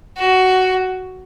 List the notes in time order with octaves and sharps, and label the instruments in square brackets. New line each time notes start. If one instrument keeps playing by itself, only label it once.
[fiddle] F#4